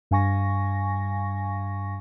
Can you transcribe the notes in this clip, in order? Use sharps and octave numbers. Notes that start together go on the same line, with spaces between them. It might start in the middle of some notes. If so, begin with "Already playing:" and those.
G2 F5 G#5 C#6 A#6